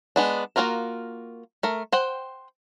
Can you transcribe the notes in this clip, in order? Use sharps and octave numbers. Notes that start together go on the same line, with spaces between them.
G#3 B3 D4
A#3 C4 F4 F#4 A#4
A3 A#4
C5 F#5 G5